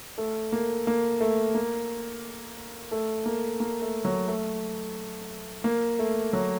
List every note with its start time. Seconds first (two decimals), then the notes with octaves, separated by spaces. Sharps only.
0.18 A3
0.52 A#3
0.87 A#3
1.21 A3
1.55 A#3
2.91 A3
3.26 A#3
3.60 A#3
3.82 A3
4.05 F#3
4.28 A3
5.64 A#3
5.99 A3
6.33 F#3